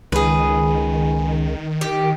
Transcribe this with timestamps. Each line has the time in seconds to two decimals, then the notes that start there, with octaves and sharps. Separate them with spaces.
0.12 C#2 D#3 G#4 B4
1.81 G4